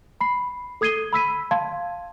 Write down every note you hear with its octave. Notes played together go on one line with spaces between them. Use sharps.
B5 C7
A4 D#6 G#6 C7 D#7 G7
B5 E6 B6 D#7
F5 A5 C6 G#6